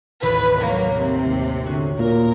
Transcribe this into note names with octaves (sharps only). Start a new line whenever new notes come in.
A1 D#2 C3 B4
F#3 A#3 C#5
C3
D#2
D3 C#4 F#4
A#2 A#4